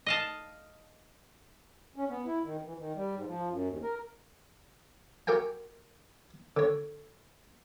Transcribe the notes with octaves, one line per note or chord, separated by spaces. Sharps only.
D#5 F5 A5
C#4
B3
E4
D#3
E3
D#3
G3
G#2
F3
F#2
D#2
A#4
F#4 G4 A#4 G5 G#5
D3 C#5